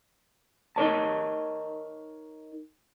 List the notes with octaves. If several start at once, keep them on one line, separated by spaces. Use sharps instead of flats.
D#4 A#4 C#5 A5